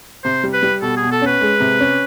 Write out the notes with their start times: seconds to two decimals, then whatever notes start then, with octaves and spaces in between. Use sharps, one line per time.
0.24 C3 C5
0.44 G3
0.53 B4
0.63 G3
0.82 B2 A4
0.97 G#4
1.02 B2
1.12 A4
1.22 C#4 B4
1.41 G#3
1.60 C3
1.80 C#4